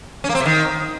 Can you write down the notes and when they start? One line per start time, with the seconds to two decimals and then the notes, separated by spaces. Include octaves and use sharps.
0.24 C#4
0.29 A#3
0.35 C4
0.40 C3
0.45 D#3